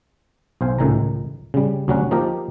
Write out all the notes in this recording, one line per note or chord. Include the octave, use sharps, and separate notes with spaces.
B1 C5 F5 G#5
C#2 A2 D#3 G#5 A#5
C#3 G3
D2 F#3 G3 C#4 F#5
F3 A#3 D#4 G4 A#4